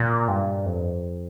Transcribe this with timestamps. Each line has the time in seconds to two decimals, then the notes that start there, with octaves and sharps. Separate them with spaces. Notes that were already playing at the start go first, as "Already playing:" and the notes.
Already playing: A#2
0.28 G2
0.66 F2